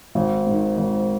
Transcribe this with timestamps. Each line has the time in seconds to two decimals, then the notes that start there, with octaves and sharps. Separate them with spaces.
0.15 G#1
0.47 G#2 D#3
0.78 G#1